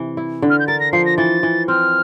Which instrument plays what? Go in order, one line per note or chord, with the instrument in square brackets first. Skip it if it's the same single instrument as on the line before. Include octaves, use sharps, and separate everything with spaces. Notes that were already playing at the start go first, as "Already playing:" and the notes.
Already playing: [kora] C3 E3
E4
D3
[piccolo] F6
G6
[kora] A#4 [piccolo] A6
[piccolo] A#6
[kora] F3 [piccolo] C7
[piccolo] A#6
[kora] E3 [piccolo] A6
[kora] E3
[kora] C4 [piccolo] F6